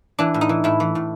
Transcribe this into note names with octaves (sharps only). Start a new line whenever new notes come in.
E3 D4
A2
D#4
E3
A2 E4
E3
A2